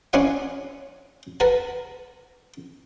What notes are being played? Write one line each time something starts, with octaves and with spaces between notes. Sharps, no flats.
C#4 D4 E4 C#5 F5 F#5
A#4 B4 F#5 A5